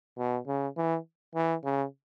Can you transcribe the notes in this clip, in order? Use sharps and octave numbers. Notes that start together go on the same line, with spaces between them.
B2
C#3
E3
E3
C#3